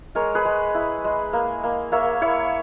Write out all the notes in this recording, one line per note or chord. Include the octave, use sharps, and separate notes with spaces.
G#3 A#4 C#5
G#4 B4
G#3
E4
G#3
A#3
A#3
A#3 C#5 E5
E4 C#5 E5